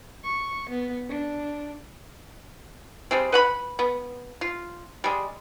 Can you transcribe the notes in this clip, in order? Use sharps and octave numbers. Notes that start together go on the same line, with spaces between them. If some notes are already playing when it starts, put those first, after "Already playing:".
C#6
B3
D4
G3 G#3 C4
B4 F#5 B5
B3
F4
G3 G#3